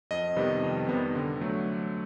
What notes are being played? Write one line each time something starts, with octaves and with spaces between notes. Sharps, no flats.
F2 D#5
C3 D#3 G3 B3
F2
C3 D#3 G3 B3
D3
F#3 A3